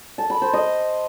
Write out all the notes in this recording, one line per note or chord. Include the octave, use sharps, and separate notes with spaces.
A5
B5
C5
D#5